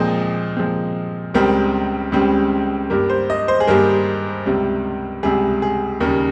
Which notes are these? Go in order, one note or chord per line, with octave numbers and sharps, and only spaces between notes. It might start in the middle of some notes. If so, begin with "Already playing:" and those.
Already playing: A#2 F3 G#3 C4 D#5
A#2 F3 G#3 C4
C#2 C#3 G3 C4 A#4
C#2 C#3 G3 C4
G2 G3 A#3 A#4
C5
D#5
C5
G#4
G2 G3 A#3 A#4
C#2 C3 G3
C#2 C3 G3 G#4
G#4
D#2 C#3 G3 A#4